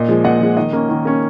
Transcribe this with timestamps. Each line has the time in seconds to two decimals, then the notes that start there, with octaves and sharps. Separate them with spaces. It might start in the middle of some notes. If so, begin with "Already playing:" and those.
Already playing: A#2 D#5
0.08 F3 G#3
0.24 A#2 D#5 F#5
0.41 F3 G#3
0.57 D#3 D#5
0.73 A#3 C#4
0.89 D#3
1.05 A#3 C#4